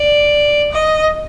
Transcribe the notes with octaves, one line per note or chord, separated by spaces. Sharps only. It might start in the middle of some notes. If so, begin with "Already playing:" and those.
Already playing: D5
D#5